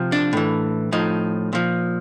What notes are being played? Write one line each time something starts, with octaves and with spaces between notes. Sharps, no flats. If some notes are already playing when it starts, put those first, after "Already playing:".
Already playing: C3 F3
D4
A2 E3
A2 F3 D#4
A#2 F3